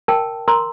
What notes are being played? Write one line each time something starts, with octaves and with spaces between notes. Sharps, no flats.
A#4 G5 A5
A#4 A#5 C6